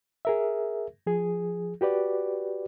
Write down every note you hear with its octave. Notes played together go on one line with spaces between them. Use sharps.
G#4 A#4 E5
F3 G#4
F#4 G4 B4 D5